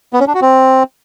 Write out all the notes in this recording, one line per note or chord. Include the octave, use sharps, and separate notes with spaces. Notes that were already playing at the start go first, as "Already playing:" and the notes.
B3
C#4
D4
F#4
C4